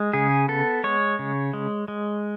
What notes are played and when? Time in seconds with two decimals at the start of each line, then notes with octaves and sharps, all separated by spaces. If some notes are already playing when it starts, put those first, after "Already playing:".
Already playing: G#3
0.13 C#3 G#4
0.48 B3 A4
0.84 G#3 C#5
1.19 C#3
1.53 G#3
1.88 G#3